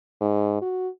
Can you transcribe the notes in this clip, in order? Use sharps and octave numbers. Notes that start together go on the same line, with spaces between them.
G#2
F#4